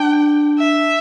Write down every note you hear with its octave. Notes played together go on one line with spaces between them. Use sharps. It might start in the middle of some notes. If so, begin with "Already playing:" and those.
Already playing: D4 G5
E5